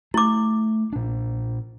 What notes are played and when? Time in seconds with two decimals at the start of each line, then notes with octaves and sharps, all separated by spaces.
0.14 A3 E4 D6
0.93 A#2 D4